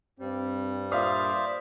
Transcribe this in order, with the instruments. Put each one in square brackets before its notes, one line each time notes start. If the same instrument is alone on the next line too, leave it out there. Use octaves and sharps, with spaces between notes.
[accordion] G2 G3 [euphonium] C4
[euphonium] A#2 [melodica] C5 D5 E5 [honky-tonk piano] F5 D#6